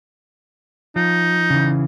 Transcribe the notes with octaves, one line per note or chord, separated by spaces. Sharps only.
F3 D#4
C#3 E3